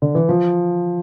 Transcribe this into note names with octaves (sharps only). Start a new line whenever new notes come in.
D3
E3
F3